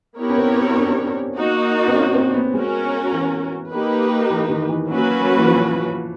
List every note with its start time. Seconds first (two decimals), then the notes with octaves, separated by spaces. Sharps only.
0.18 B3 E4 G4 A#4 C#5
0.30 C#4
0.38 C4
0.57 C4
0.77 D4
0.87 C#4
0.96 C4
1.05 C#4
1.37 A#3 D#4 F#4
1.88 C4
1.95 C#4
2.14 C4
2.34 B3
2.54 G#3 C#4 F#4 A#4
3.12 E3
3.71 A#3 D#4 G4 B4
4.30 E3
4.50 D#3
4.69 E3
4.89 F#3 A#3 C#4 F#4 B4
5.39 E3
5.48 F3